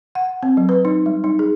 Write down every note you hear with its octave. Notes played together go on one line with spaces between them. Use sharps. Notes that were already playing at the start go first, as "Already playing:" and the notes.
F#5
C4
F#3
B4
D#4
G3
D#4
G#4